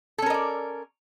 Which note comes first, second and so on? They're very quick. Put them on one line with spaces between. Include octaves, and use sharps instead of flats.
A4 C#4 A#4 D#5 D5